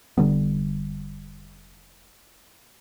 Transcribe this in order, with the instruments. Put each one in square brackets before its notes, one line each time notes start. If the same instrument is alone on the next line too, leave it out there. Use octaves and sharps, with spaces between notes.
[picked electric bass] F1 D3 G3 B3